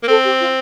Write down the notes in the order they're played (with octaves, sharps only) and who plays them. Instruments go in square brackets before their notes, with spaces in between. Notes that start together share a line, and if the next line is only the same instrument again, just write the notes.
[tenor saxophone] A#3
[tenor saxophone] C4 [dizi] A4
[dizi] G4
F4